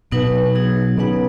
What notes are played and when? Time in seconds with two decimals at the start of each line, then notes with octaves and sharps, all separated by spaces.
0.12 B2 F#3 B3 D#4 B4
0.55 F#3 D#4 G#4
0.97 C#3 B3 D#4 B4 F#5